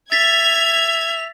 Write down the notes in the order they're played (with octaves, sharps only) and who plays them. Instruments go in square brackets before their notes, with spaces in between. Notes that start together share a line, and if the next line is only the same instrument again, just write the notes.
[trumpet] E5 [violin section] G#6 [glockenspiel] A6 B6 [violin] F7